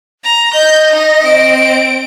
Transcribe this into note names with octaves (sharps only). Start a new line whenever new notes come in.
A#5
D#5 G6
D#4
C4 D7